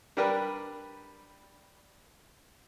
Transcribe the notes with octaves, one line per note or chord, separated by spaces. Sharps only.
G3 D4 G4 A#4 B4